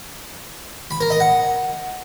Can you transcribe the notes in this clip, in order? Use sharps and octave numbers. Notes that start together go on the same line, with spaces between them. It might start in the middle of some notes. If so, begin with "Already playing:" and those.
B5
A#4
D#5
F#5